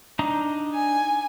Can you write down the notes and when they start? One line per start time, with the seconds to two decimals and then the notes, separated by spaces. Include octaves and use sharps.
0.19 D4 D#4 A#5
0.74 G#5